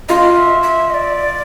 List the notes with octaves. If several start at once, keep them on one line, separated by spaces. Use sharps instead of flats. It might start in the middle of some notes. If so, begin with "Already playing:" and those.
F4 D#5
E5
E5
D#5
D5